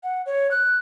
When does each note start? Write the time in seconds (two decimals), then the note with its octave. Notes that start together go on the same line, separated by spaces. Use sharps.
0.03 F#5
0.26 C#5
0.51 F#6